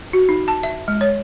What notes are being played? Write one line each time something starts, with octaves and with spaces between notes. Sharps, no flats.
F#4
D#4
A5
E5
G#3
C#5